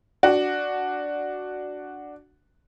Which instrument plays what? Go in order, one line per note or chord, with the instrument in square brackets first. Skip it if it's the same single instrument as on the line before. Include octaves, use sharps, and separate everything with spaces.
[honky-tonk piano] D4 F#4